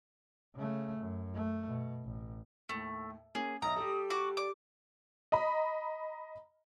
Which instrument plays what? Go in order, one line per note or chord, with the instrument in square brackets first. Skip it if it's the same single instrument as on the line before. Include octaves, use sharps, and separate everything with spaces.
[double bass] C#3 A3
F#2
A3
B2
A1
[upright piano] D#2 A2 [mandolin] A3
[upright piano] A#3 C#4 [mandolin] G#4
[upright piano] B1 D#5 E5 [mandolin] A#5 [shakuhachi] D#6
[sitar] G3 [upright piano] G4 A4
[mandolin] F#4 D6 [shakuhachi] C#6
[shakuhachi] D5 [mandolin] D6
[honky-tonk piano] D#5 A#5 B5